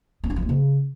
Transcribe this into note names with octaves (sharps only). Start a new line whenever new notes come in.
B3
D4
F3
A#3
C#3